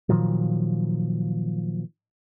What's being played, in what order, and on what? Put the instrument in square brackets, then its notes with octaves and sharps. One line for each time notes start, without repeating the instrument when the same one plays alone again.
[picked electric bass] A#2 D#3 F3 F#3